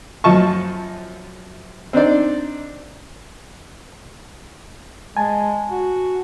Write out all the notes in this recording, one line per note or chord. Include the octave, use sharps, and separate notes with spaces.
F#2 F3 D#5 A5 C#6
C4 D4 D#4 D5
G#3 G#5 A5
F#4